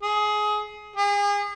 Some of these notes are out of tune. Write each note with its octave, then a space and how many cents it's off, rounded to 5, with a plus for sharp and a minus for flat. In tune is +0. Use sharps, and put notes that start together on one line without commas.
G#4 +20
G#4 -35